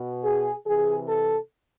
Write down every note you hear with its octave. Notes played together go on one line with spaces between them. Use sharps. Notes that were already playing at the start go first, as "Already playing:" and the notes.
Already playing: B2
G#4
C3 E3 G#4
A4